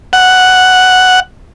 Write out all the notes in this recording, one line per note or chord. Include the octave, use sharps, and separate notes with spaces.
F#5